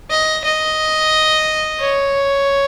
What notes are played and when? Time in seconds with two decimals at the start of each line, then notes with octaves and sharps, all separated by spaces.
0.10 D#5
0.44 D#5
1.80 C#5